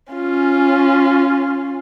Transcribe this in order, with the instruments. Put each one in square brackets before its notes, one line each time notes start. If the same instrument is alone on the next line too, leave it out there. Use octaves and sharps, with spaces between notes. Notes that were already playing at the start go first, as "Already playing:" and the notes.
[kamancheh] C#4 F4